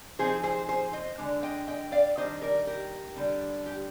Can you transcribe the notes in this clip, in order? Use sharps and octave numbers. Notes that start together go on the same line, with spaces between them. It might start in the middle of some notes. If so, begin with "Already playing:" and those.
F3 C4 D#4 G#4 C5
G#4 C5
G#4 C5
C5 D#5
D3 G#3 D4
D#5 G5
D#5 G5
D5 F5
D#3 G3 D4 C5 D#5
A#4 D5
G4 A#4
D3 G3 D4
G4